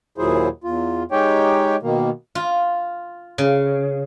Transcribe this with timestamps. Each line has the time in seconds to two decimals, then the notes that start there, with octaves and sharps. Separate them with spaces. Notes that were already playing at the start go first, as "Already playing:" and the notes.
0.18 D#2 A#2 F#3 E4 G#4 C5
0.64 E2 F4
1.11 G#3 D#4 G4 C#5 G5
1.82 B2 D#3 A#3
2.35 F4
3.38 C#3